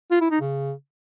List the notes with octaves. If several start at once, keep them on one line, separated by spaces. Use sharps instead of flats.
F4
E4
D#4
C#3